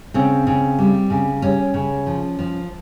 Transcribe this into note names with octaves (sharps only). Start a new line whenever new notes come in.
C#3 C4
C#3
G3
C#3
G3 C#4
C#3
F3
F3